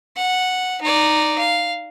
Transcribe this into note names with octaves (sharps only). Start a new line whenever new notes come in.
F#5
D#4 D5
F5